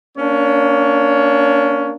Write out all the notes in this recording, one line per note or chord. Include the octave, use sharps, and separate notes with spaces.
A#3 C#4 D4 C#5